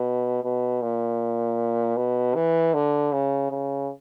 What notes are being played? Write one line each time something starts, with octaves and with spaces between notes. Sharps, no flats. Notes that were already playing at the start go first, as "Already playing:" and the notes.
Already playing: B2
B2
A#2
B2
E3
D3
C#3
C#3